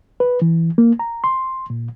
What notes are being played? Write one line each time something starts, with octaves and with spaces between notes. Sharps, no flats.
B4
E3
A#3
A#5
C6
A#2